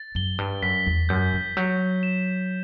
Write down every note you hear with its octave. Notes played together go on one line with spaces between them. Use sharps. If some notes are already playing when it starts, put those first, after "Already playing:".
Already playing: A6
F#2 G7
G2
F#2 B6
E2
F#2 G6
E3
F#3 G6
E7